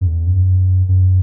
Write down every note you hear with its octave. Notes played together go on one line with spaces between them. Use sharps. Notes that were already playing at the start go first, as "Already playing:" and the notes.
F#2
E2
F#2
F#2